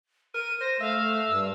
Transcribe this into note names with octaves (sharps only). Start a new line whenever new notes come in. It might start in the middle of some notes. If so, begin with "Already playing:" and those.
A#4 D#7
C5 A#6
A3 E5 F5
G2 E6